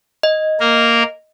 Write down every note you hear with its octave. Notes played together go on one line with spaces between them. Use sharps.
D#5
A#3 A#4